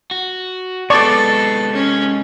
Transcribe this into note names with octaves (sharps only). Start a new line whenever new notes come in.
F#4
C3 G#3 B3 A4 D5 C#6
C#4